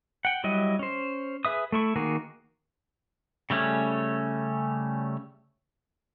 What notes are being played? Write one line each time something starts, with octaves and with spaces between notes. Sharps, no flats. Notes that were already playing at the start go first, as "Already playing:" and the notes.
F#5 G5
F#3 G3 E4 D#5
C#4 C5
G#4 B4 E5 D#6
A3 E4 C#6
D#3 A#3 F#4 G#4
C#3 G3 A3 C#4